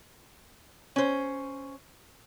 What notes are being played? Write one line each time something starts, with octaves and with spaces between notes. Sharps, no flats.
C#4 C5